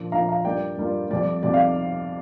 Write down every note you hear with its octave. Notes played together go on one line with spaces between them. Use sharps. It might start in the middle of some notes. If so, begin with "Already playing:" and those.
Already playing: A#2 F3 D4 F4
A#2 F3 D4 F4 F5 A#5
F5 A#5
G2 G3 A#3 F4 D5 G5
G2 G3 A#3 F4
F2 C3 G3 D5
F2 C3 G3 D5
F5